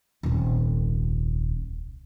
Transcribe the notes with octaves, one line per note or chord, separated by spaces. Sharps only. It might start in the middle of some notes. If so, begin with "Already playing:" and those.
D#1 C2